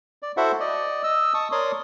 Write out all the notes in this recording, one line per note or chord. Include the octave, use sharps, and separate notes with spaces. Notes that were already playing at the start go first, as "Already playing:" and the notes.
D5
E4 F#4 A4 C5 E5 F#5
D5 D#5
D#5 E6
A5 C#6 D#6
A#4 C#5 D5 C6 D6 D#6